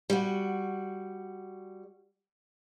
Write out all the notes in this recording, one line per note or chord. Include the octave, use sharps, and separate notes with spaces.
G3 F#4